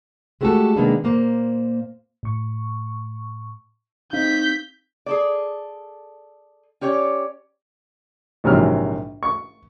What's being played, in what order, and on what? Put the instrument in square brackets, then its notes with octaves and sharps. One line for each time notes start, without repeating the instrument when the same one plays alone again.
[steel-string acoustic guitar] G#3 A3 B3 F#4 G4 A4
C3 D#3 G#3 A#3 B3 D4
A#2 A#3 C5
[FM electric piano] A2 C#6
[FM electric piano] C4 D#4 F5 [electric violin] G6 B6
[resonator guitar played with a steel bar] G#4 A4 D5
C#4 G4 C#5 D5
[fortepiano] A#1 G#2 C3 E3 F#3 F6
C#6